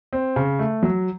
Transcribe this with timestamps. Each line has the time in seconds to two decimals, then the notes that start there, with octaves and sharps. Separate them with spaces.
0.13 C4
0.36 C#3
0.59 A3
0.83 F#3